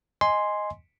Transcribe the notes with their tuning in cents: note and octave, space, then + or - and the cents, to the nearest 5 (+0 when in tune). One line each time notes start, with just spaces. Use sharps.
D#5 +0 G#5 +0 C6 +0